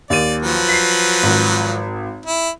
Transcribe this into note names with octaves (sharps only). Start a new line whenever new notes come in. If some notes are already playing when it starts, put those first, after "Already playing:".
D#2 D5 D#7
F3 F#3 B4
B6 C7
G#1
E4